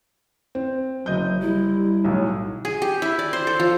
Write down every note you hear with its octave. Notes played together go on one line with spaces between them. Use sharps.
C4
F#1 F#3 D#5 G6
G3 E4
B1 A2 F#3
G#4
G4
E4
D5
C5
A4
F3